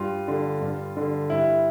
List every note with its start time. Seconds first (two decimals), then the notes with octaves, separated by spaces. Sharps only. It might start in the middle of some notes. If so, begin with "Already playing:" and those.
Already playing: G2 F4
0.28 D3
0.61 G2
0.97 D3
1.30 G2 E4